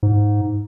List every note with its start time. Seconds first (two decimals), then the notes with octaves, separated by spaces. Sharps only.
0.03 G#2